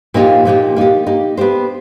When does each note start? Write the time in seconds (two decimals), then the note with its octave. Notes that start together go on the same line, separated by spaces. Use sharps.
0.14 A#2 F3 A#3 D#4 G4
0.45 A#2 F3 A#3 D#4 G4
0.76 A#3 D#4 G4
1.07 A#3 D#4 G4
1.37 B3 D4 G4 C5